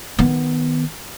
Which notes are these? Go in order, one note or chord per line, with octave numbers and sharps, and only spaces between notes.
D#3 B3